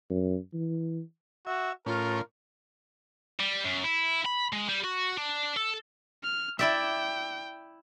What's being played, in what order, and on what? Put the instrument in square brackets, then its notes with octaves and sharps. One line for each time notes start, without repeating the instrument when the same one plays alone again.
[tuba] F#2
E3
[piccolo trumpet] F#4 [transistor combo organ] E5
[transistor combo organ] A2 C#4 [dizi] F4 [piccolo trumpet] A#4
[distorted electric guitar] G3
F#2
E4
B5
G#3
G3
F#4
D4
A4
[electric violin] F6
[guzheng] E4 D5 E5 [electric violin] G5